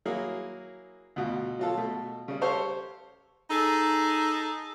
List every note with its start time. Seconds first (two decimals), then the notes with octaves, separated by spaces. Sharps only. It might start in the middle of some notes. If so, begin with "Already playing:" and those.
0.06 F#3 A#3 E4 G#4
1.16 D2 B2 F4
1.59 F#3 F4 A4
1.77 B2 A3
2.28 C#3 G3
2.41 G4 A4 C5 C#5 F5 C#6
3.50 D#4 G#4 A4